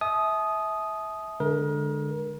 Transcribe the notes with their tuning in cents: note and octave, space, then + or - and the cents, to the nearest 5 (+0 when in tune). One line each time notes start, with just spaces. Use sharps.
E5 -25 A5 -40 D#6 +0
D3 +0 G#3 +0 A#4 +30